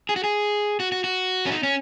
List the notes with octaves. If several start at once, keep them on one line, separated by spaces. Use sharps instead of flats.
G#4
F#4
G#4
F#4
F#4
F#4
C#4
D#4
C#4